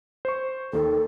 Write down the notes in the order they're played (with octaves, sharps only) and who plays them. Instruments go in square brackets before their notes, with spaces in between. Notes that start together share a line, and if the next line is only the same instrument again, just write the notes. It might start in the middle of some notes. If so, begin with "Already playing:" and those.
[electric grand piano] C5 C#6
[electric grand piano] D#2 D#3 [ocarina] A4